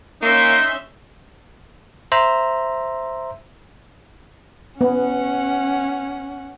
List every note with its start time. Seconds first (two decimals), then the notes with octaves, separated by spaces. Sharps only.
0.23 A#3 C#4 D#4 E5 C6
2.12 C5 E5 A#5
4.81 B3 C#4 F#5